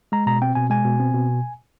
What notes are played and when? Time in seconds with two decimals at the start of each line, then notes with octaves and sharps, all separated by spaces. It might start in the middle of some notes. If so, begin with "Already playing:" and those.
0.12 G#3 A#5
0.26 B2 A#5
0.42 C4 G5
0.55 B2 G#5
0.70 G#3 G#5
0.85 B2
1.00 C4
1.14 B2